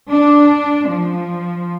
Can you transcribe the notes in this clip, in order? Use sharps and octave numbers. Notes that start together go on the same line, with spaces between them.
D4
F3